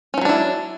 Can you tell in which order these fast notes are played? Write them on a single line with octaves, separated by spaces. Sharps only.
C#4 F3 F#3 D4 E4